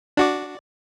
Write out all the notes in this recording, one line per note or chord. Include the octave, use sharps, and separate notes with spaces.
D4 F#4 D5